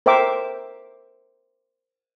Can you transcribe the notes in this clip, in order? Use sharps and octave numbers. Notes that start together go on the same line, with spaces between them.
A#4 C5 E5 G5 D6